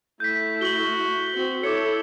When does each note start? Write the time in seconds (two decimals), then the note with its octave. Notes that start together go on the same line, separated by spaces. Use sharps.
0.20 A3 E4 G6 B6
0.61 F#4 F#7 G7
1.34 C4 F#4
1.63 E4 A4 C#5 D6 C#7